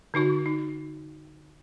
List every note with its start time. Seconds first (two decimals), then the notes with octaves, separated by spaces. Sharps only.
0.14 D3 D#4 F#4 C#6
0.46 D#4